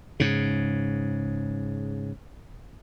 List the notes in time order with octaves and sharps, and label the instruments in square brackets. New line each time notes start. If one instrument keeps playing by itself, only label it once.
[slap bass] G#2 C#3